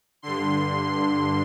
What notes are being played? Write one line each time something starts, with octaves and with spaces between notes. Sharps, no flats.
G2 D3 C6